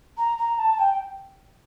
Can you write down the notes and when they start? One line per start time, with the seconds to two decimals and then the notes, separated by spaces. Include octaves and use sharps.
0.18 A#5
0.38 A#5
0.59 A5
0.79 G5